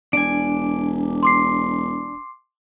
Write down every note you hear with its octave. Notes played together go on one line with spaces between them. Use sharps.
E1 D4 G#5 D7
C6 D6 C7